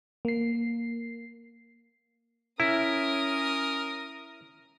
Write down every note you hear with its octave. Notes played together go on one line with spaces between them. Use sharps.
A#3 C7
C#4 E4 A#4 D#6